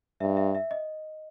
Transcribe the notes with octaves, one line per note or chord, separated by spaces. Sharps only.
G2 E5
E5
E5
D#5